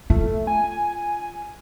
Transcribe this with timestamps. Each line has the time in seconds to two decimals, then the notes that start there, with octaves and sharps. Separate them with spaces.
0.10 A3 F4
0.47 G#5